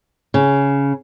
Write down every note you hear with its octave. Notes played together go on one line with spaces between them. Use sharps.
C#3